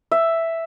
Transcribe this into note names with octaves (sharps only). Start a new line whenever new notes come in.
E5